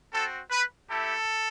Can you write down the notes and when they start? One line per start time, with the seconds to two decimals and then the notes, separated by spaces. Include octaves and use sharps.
0.13 C4 F#4 A4
0.51 B4
0.89 A3 E4 G4 A4